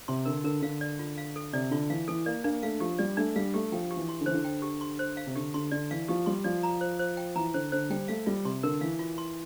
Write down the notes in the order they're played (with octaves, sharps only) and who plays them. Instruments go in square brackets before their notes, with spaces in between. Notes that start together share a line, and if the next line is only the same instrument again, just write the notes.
[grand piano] C3 [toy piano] C6
[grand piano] D3 [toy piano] A#4
[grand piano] D3 [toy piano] A#4
[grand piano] D3 [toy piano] F5
[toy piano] D5
F4
F5
A4
[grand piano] C3 [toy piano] D5
[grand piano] D3 [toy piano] F4
[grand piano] E3 [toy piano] F5
[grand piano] E3 [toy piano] A4
[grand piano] A#3 [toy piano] D5
[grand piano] A#3 [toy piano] D4
[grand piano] A3 [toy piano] F5
[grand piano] F3 [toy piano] G4
[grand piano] G3 [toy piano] D5
[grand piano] A3 [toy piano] D4
[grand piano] G3 [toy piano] F5
[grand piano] A3 [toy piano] G4
[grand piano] F3 [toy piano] G5
[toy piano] G4
[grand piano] E3
[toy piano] C6
[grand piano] D3
[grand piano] E3 [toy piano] C5
[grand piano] D3
[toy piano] G5
G4
C6
C5
F5
[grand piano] C3
[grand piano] D3 [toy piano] G4
[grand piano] D3 [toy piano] C6
[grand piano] D3 [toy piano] D5
[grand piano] E3 [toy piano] F5
[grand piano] F3 [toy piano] G4
[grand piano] G3 [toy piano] C6
[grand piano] F3 [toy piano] D5
[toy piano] A#5
C5
C5
G5
[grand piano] E3 [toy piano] A#5
[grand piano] D3 [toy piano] C5
[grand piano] D3 [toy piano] C5
[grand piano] G3 [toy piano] G5
[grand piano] A3 [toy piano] F5
[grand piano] G3 [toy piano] F4
[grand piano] C3 [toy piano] C6
[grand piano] D3 [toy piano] A#4
[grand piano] E3 [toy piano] F5
[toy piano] F4
C6